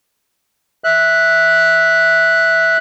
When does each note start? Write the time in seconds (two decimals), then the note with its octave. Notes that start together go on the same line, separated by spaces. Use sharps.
0.84 E5 F#6